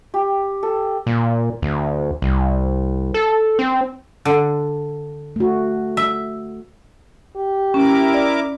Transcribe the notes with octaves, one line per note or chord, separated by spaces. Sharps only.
G4
A4
A#2
D2
C2
A4
C4
D3
A3 F#4
E5
G4
C#4 E4 A#4 D6
D5